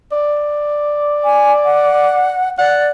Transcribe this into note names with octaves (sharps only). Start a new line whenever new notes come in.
D5
G#5
F#5
D5 F#5